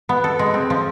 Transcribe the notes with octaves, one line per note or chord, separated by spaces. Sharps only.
B3
A4
G#3
C4
F3